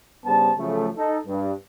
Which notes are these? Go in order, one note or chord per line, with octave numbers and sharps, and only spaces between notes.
G2 C#3 G3 B3 C5 A5
C#3 F3 F#3 A3
D#4 A4
G2